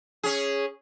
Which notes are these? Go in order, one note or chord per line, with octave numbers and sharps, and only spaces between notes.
C#4 G#4